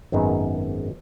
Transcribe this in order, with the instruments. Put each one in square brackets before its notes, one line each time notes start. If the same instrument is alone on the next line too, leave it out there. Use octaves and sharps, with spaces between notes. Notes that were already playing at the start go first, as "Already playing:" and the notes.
[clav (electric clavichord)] G#1 F#2 D#3 G#3 B3